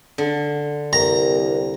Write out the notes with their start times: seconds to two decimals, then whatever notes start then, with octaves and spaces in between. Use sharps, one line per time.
0.18 D3
0.93 C2 A#4 A#5